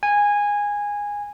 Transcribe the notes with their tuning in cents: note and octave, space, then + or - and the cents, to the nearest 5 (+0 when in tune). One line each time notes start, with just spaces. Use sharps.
G#5 -15